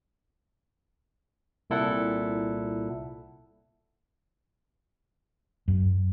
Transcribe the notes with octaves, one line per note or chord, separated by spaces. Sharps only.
C2 A#2 E4 A4 F#5
F#2